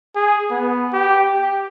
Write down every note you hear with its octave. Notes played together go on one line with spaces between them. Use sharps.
G#4
B3
G4
G4